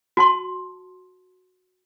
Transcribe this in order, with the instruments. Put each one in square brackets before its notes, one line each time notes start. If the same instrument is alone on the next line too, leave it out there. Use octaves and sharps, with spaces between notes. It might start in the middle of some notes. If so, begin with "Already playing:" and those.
[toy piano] F#4 A5 C6